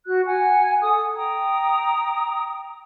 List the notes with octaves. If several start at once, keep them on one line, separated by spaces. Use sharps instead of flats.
F#4 F#6
F#5 G#5
A4 D#6
G5 A#5 D#6